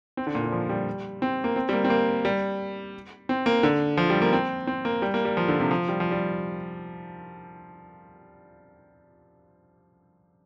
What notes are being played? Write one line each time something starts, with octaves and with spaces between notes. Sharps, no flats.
C4
D3
A#2
D3
F3
G3
C4
A#3
C4
G3
A#3
C4
A#3
G3
C4
A#3
D3
F3
G3
A#3
C4
C4
A#3
G3
A#3
G3
F3
D3
C3
F3
G3
F3
G3